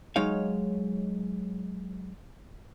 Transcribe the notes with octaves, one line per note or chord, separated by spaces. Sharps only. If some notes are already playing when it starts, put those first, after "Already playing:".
F#3 G#3 D#4 C#5 F5